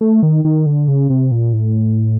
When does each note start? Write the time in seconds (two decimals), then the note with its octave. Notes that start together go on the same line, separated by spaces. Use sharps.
0.01 A3
0.23 D#3
0.45 D#3
0.66 D3
0.88 C#3
1.10 C3
1.31 A#2
1.53 A2